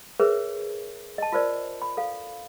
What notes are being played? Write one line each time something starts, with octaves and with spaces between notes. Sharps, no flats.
G#4 A#4 B4 C#5 E5
D#5 A5
F4 A#4 C5 D5
B5
A4 F5